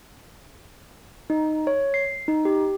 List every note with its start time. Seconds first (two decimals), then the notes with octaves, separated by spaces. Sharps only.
1.30 D#4
1.67 C#5
1.94 C7
2.28 D#4
2.45 G4